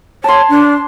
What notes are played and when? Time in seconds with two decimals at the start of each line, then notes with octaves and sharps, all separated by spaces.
0.24 C#5 A5 C6
0.49 D4